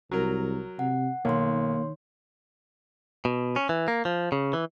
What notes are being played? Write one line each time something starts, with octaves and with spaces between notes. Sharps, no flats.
C2 F#3 A#4
C3 F#5
B1 D#3 A#3 C#5 C6
B2
C#4
E3
A#3
F3
C#3
E3